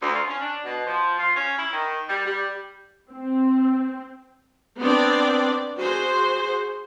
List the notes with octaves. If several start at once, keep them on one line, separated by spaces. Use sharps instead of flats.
D2
F4
C#4
D4
B2
F3
F4
C#4
E4
D#3
G3
G3
C4
B3 C4 D4 D5
F#4 G#4 C5